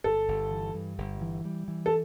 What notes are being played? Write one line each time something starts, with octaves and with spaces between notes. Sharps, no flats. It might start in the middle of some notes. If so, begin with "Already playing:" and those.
G1 A4
G1
E3
G2
G1
E3
G3
E3
A4